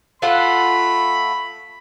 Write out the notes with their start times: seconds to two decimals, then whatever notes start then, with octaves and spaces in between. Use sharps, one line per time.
0.22 A3 F4 F#5 B5